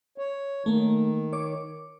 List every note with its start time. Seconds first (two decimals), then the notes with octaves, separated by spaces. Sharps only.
0.18 C#5
0.66 D#3 A3 A#3
1.33 C#5 D6